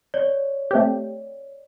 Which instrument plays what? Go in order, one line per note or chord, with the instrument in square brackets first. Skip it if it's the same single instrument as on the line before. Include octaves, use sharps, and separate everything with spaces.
[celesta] C#5 D5
[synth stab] A3 C4 G4